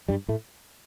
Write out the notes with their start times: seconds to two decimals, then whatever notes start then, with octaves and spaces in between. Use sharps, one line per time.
0.08 G2 G3
0.29 A2 A3